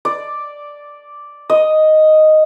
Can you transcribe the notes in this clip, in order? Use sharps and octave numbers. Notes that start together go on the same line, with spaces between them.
D5
D#5